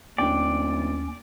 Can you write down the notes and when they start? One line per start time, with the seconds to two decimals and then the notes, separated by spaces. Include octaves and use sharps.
0.18 D1 D#2 C#4 D4 D5 G5